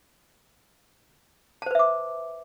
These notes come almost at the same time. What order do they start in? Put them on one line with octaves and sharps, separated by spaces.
A5 C5 B4 E5 D6